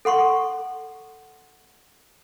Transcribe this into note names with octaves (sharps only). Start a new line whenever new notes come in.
A4 F#5 C6 C#6